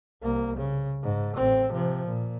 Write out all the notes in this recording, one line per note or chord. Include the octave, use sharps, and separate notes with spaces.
C2 A#3
C#3
G#2
A1 C4
C3 F3
A#2